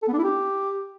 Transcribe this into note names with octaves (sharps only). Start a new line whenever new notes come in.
A4
B3
D4
E4
G4